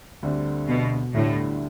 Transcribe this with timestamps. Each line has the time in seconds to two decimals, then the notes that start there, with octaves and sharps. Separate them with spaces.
0.23 D2 D3 G3 C4
0.68 B2
1.14 D2 A2 D3 G3 D4